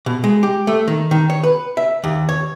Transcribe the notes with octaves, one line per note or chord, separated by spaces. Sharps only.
B2
G#3
G4
A3
D#3
D#3
C#5
B4
E5
D#2
C#5